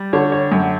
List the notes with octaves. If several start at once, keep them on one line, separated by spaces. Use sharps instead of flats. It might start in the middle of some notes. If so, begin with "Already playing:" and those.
Already playing: G3
D3 C#5
C#5
F#2